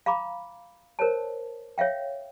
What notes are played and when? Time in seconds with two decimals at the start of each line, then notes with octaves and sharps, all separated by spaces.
0.06 F5 A#5 B5 D6
0.99 A#4 C5 C#5 A5
1.78 C#5 E5 F5 G5